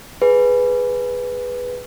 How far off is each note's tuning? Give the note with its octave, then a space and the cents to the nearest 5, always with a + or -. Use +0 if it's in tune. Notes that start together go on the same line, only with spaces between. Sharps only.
G#4 +0 B4 +0